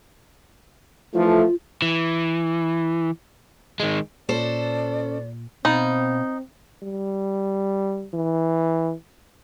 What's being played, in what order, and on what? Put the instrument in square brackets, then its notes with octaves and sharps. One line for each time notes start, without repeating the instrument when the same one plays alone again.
[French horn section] E3 F3 A3 [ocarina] F4
[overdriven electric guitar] E3
D#3 G#3
[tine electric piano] A#2 [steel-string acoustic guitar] C#4 A4 C5 [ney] D5
[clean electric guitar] B2 F5 B5 [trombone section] C4 [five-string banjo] D#4
[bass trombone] G3
E3